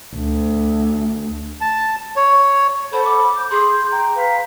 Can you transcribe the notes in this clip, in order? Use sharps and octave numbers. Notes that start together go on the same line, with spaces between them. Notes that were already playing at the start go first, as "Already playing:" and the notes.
D2
A5
C#5
A4 C5 F#5 B5
D6
G6
G#4 C6
G5 A#5
B4 F5